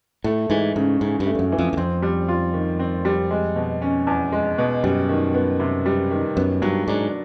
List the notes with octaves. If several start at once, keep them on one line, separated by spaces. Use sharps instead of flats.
A2 A3
G#2 E3
G#2 C#3
G#2 C#3
G2
A3
G2
F#2
E3
F2
E2
F2 C4
G3
F4
D#3
C4
G3
G#3
B2
C#4
E2
G#3
B2
F#2 G3
D#3
B3
C3
G3
D#3
F#2 B3
G2 F#3
G#2 D4